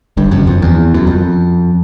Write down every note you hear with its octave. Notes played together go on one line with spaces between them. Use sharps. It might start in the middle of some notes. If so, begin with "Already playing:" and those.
G1 G2
F#1 F#2
F2
E2
F#2
F2